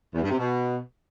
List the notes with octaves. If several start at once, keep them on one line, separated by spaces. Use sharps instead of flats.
E2
G2
C3
B2